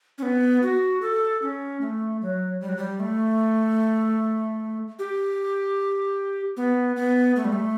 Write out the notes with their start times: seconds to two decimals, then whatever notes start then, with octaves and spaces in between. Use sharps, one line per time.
0.18 C#4
0.23 B3
0.63 F#4
1.02 A4
1.42 C#4
1.81 A3
2.22 F#3
2.61 G3
2.69 F#3
2.77 G3
3.00 A3
4.99 G4
6.57 B3
6.96 B3
7.36 A3
7.44 G3
7.52 A3